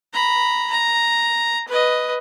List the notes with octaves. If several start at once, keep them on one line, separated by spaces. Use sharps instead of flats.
A#5 B5
A#5
B4 D#5